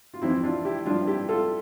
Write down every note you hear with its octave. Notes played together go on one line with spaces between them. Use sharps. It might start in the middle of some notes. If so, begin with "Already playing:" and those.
F4
F2 E3 C4 E4
D4 F4
E4 G4
G2 F3 D4 F4
E4 G4
F4 A4